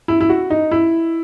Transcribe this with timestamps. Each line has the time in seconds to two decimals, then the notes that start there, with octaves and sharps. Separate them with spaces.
0.08 E4
0.21 E4
0.30 F#4
0.50 D#4
0.71 E4